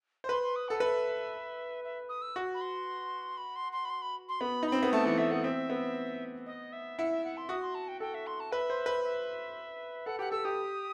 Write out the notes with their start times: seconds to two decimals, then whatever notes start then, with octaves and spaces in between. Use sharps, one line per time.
0.24 C5
0.29 B4 C6
0.43 C6
0.56 D#6
0.68 A4 F#5
0.80 B4 E5
1.84 E5
2.09 D#6
2.22 E6
2.36 F#4
2.54 B5
2.61 C6
3.37 B5
3.56 C6
3.72 C6
3.85 B5
3.89 C6
4.02 B5
4.29 C6
4.41 B3 B5
4.63 D#4 B5
4.72 C4
4.83 B3
4.92 A3 A5
5.05 E3 F#5
5.17 A3 E5
5.31 B3 F#5
5.44 C4 E5
5.70 B3
6.46 D#5
6.72 E5
6.99 E4 F#5
7.11 E5
7.24 F#5
7.37 C6
7.49 F#4 D#6
7.62 C6
7.75 A5
7.88 G5
8.00 A4 G5
8.14 E5
8.27 C6
8.40 A5
8.52 B4 E5
8.70 C5
8.86 B4
9.04 E5
10.06 A4 F#5
10.19 G4 F#5
10.32 A4 E6
10.45 G4 D#6